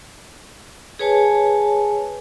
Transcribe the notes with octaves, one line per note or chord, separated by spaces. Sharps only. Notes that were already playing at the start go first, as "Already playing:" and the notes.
G#4 B4 C#5 G#5 A5